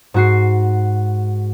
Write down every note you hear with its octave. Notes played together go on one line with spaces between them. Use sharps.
G#2 F#4 C7